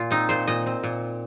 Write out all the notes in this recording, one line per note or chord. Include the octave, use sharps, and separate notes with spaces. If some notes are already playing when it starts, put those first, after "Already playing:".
Already playing: A#2 F4
C4 D#4
A#2 C5
A#2 D#5
C4
A#2